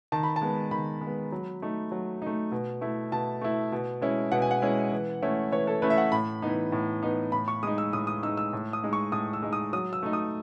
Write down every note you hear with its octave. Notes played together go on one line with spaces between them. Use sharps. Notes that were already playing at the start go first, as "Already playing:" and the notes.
D#3 A5
B5
A5
G#3 B3
D#3 B5
G#3
B3
F#3
A3 D#4
F#3
A3 D#4
B2
A3 E4
B2 A5
A3 E4
B2
G#3 C#4 E4
B2 F#5
G#5
F#5
G#3 C#4 E4
E3
A3 C#4 E4
E3 C#5
A4
A3 C#4 E4 B4
E5
F#5
A2 B5
E3 B3 D#4
A2
E3 B3 D#4
A2 B5
C#6
G#3 D#4 D#6
E6
A2 D#6
D#6
G#3 D#4 E6
E6
A2
D#6
G#3 D#4
C#6
A2 D#6
E6
G#3 D#4
D#6
F#3 D#6
E6
A3 D#4
D#6